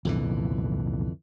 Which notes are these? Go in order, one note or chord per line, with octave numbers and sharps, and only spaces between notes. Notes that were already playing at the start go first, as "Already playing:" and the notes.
C2 F2 A#2 D3 E3